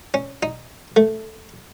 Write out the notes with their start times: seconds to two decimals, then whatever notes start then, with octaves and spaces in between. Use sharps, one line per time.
0.14 C#4
0.43 D#4
0.96 A3